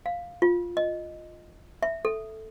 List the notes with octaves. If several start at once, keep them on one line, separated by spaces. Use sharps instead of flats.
F5
F4
D#5
E5
A4